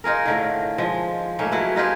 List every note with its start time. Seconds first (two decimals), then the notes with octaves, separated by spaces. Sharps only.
0.04 D#4 F4 G#4 A#4
0.26 A2 D3 D#3
0.78 F3 G#3
1.39 G#2 A3 A#3 C#4
1.52 F#3 E4 B4
1.76 D#4 F4 G4 G#4